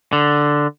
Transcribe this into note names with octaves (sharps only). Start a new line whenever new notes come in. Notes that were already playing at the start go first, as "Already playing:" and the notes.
D3